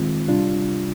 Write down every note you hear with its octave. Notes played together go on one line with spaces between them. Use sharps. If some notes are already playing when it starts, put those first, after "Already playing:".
Already playing: D#3 G#3 C4 F4
C3 G3 D4 F4